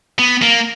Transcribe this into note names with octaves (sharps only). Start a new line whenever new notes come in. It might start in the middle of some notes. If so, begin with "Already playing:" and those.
B3
A#3